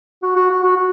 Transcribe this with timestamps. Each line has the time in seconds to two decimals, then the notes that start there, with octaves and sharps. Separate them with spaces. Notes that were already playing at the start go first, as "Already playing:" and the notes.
0.23 F#4
0.36 F#4
0.50 F#4
0.63 F#4
0.76 F#4